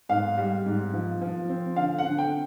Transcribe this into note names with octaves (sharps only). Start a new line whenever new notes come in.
G#2 F5
G3
G#2
F3
F3
C4
D3 F5
F#5
D3
G5